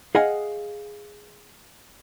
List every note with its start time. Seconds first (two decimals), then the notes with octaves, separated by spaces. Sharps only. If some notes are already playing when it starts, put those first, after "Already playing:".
0.15 G#4 D#5 F5 F#5 G#5